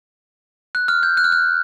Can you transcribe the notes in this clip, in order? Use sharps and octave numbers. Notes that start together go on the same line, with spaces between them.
F#6
F6
G6
F#6
F6
F#6